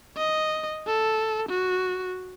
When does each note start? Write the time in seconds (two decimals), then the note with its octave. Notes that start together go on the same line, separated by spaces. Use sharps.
0.17 D#5
0.87 A4
1.49 F#4